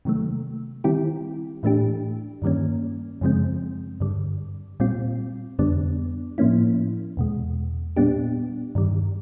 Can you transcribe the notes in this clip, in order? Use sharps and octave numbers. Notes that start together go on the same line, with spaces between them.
C3 D#3 F#3 A3
D#3 G3 C4 E4 G4
A2 E3 A3 D4 G4
G2 D#3 G3 A#3 C#4
F#2 C#3 F3 G#3 C4
G2 D3 G3
A#2 G3 C4 F4
F2 D3 G3 B3 D4
A2 F3 A#3 C#4 E4
E2 B2 G#3
A#2 G3 B3 D4 G4
G2 D#3 G3